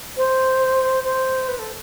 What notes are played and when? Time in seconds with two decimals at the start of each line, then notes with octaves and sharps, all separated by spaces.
0.16 C5
1.03 C5
1.48 B4
1.58 A4